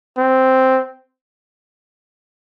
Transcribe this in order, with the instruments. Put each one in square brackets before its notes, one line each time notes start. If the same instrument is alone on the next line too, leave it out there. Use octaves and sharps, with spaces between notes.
[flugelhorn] C4